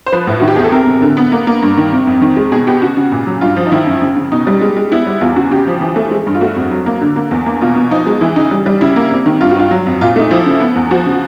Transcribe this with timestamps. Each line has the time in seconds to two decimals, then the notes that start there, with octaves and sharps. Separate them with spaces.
0.06 C5
0.12 F3 B4
0.27 A2
0.40 D#3 F#4
0.48 G4
0.56 E2 G#4
0.64 A4
0.72 C3 A#4
0.87 C3
1.02 D3
1.17 B3
1.32 A#3
1.47 A#3
1.62 G2
1.77 D#3
1.92 C3
2.07 F2
2.22 D#3
2.37 G#3
2.52 B2 G#4
2.67 B3 G4
2.82 C#3 F#4
2.97 C#3
3.12 A#2
3.27 F#3
3.41 G2 F4
3.56 F3
3.66 D#4
3.72 D#3 E4
3.87 F#2
4.02 C#3
4.17 C#3
4.32 B2 D#4
4.47 G3
4.61 G#3
4.77 G#3
4.92 B3 E4
5.07 G3
5.21 E2 F4
5.36 C#3 F#4
5.51 C#3 G4
5.67 F3
5.81 E3
5.96 A3
6.11 G#3
6.27 G2
6.34 F4
6.41 A3 F#4
6.56 F2
6.71 F#3
6.86 A#3
7.01 D3
7.16 A#3
7.31 E2
7.46 A#3
7.61 B2 F4
7.76 B2
7.91 F3 D#4
8.06 G#3
8.21 E3 E4
8.36 C#3 D#4
8.51 G3
8.66 G3
8.81 C#3 E4
8.96 A#3
9.11 C3
9.26 D#3
9.41 G2 F4
9.51 F#4
9.56 G2 F4
9.71 F#3
9.87 F2
10.01 A#2 F4
10.16 A3 D#4
10.31 F3 E4
10.46 C#3
10.60 B3
10.76 E2
10.91 F3 F#4
11.06 C#3